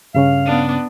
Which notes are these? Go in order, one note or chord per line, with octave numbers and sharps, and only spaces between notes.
G2 C#3 C#4 F5
B3 D4